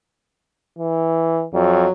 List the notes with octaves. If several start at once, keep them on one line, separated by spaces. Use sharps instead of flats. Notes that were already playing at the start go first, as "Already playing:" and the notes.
E3
F2 F#3